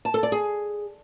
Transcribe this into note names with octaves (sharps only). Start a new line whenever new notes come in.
A5
A4
D5
G#4